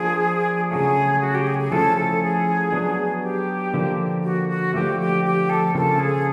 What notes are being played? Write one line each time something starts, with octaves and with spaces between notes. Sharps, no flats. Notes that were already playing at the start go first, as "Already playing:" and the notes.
Already playing: F3 A#3 D4 G#4
C#3 F#3 A3 G#4
F#4
G4
G#4
G#4
F3 A3 C#4 E4 A4
A4
G#4
F#3 B3 D4
G4
D3 F3 A#3
F#4
F#4
D3 F3 A3 G4
G4
G4
A4
C#3 F3 A#3 A4
G#4